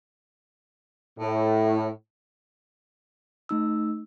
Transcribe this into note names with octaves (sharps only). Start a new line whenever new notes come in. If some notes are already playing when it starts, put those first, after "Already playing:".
A2
A3 D#4 E6